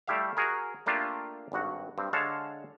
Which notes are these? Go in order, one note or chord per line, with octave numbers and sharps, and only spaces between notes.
G3 A3 E4 G4 E5 F5
F#4 G#4 A#4
A3 A#3 D4 F4 G4
G#1 G2 F#4 F#5
G2 C4
D3 G#3 C#5 F5 A5